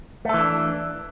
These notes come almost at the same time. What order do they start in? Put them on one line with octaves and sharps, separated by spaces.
A3 A4 E3 D4